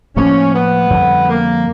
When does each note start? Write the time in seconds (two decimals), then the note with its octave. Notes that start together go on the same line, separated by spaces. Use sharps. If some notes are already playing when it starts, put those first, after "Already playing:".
0.16 A2 F3 A#3 C#4
0.54 B3
0.90 F2 D3 G3
1.28 A#3